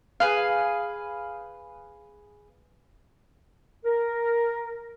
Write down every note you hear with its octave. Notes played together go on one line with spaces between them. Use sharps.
G#4 B4 F5
A#4